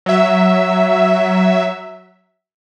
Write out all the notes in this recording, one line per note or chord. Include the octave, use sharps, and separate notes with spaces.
F#3 E5